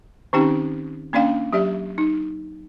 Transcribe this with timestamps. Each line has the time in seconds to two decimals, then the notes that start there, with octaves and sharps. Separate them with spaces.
0.33 D#3 C4 C#4 D#4 G4 G5
1.13 A#3 C#4 D4 D5 F5 G5
1.53 F#3 G4 D5 E5
1.98 D#4